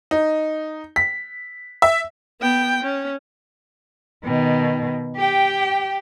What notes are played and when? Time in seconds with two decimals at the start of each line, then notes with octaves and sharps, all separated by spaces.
0.11 D#4
0.96 B6
1.82 E5
2.41 B3 G5
2.83 C#4
4.25 B2 D#3
5.17 G4 G5